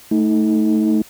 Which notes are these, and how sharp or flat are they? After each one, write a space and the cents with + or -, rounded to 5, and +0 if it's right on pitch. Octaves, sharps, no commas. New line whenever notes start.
A3 +0 D#4 +30